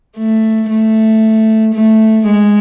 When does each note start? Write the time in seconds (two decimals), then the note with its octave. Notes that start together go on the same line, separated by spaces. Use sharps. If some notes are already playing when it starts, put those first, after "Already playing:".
0.17 A3
0.70 A3
1.74 A3
2.26 G#3